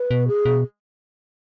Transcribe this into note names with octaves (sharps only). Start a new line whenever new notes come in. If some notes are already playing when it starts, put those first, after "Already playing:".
Already playing: B4
B2
G#4
B2